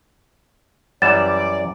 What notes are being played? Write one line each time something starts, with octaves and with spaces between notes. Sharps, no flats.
F#2 E3 G3 D5 A6 E7